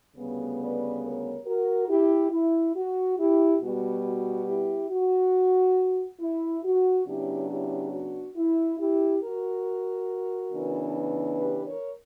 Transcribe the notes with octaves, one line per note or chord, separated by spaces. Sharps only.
D2 C#3 G3 B3
B4 D5
A#4 C#5
F#4 A#4
E4 G4
E4
F#4
E4 G4
B2 G3 B3 F#4
F#4
E4 G4
F#4
E4
F#4
C#3 F#3 B3 D4 E4 G4
E4 G4
F#4
E4
E4 G4
F#4 A#4
C#3 E3 B3 D4
G4 B4
A#4 C#5